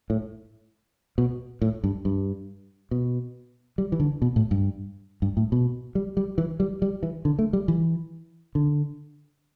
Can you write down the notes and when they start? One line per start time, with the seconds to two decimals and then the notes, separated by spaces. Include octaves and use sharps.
0.10 A2
1.18 B2
1.62 A2
1.84 G2
2.05 G2
2.91 B2
3.78 G3
3.92 E3
4.00 D3
4.22 B2
4.36 A2
4.51 G2
5.22 G2
5.37 A2
5.52 B2
5.95 G3
6.17 G3
6.38 E3
6.60 G3
6.82 G3
7.03 E3
7.25 D3
7.39 A3
7.53 G3
7.68 E3
8.55 D3